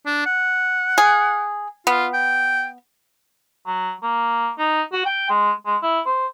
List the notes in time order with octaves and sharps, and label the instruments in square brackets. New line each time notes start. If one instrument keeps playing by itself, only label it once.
[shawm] D4
F#5
[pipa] G#4
[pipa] B3 [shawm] F4
[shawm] G5
[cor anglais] F#3
A#3
D#4
F#4
G5
G#3
G#3
E4
C5